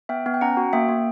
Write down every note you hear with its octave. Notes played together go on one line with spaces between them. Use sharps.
B3 E5 G5
B3
G5
C#4 F#5 A#5
F#4
A#3 E5 G5
A#3